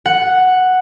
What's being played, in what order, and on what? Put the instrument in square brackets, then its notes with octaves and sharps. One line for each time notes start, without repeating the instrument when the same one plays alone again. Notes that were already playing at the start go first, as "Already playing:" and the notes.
[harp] F#5